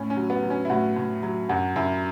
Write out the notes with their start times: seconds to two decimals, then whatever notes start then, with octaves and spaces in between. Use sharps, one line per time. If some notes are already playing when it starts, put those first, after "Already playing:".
Already playing: A2 C#4
0.10 C#4
0.17 F#3
0.30 B3
0.43 F#3
0.50 C#4
0.65 E4
0.70 A2 F#4
0.96 A2
1.23 F#3
1.49 F#2 F#4
1.76 F#2 E4